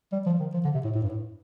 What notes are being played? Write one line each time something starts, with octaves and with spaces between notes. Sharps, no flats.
G3
F3
D#3
F3
D3
C3
A2
A2
G2
A2